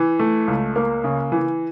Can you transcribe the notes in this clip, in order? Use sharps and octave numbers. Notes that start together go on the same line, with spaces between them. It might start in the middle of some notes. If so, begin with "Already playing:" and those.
Already playing: E3
A3
C#2
A#3
C#3
E3